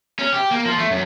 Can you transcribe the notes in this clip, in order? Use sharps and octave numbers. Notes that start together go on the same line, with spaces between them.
C#4
G4
A#3
F3
A3
F#2